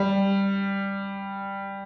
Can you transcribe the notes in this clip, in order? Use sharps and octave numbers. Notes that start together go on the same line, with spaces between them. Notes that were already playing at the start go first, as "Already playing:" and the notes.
Already playing: G3